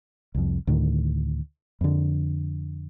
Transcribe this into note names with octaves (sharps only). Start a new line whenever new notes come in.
C2 F2
D2 A2 D#3
F2 D3